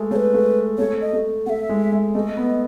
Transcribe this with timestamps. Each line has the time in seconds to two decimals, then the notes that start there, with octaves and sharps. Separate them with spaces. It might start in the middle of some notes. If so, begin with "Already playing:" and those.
Already playing: G#3 A3
0.11 A3 C#5
0.16 B4
0.34 A3
0.78 A3 C#5
1.01 D#5
1.13 A3
1.46 A3 F#5
1.50 E5
1.69 G#3
1.92 G#3
2.14 A3 D#5
2.37 B3